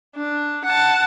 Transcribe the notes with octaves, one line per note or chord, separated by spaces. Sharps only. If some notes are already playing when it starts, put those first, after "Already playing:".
D4
F#5 A5